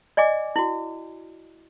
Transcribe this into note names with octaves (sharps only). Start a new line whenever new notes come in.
D5 D#5 G#5 D6
E4 F#4